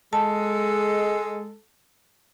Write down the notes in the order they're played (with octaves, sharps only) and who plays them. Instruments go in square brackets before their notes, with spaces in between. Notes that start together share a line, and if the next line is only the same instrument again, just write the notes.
[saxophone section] G#3 [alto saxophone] A4 [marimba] A5